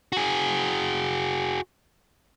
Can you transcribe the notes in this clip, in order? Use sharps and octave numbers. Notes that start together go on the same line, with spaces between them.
F#4 G#4